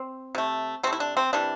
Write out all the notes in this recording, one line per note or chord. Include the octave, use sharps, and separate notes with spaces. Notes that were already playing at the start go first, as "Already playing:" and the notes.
Already playing: C4
C3 A3
C3 A3 C4
E4
D4
C4
C3 E3 G3 D4